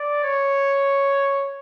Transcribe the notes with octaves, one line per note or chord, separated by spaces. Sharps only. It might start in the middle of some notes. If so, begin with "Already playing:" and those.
Already playing: D5
C#5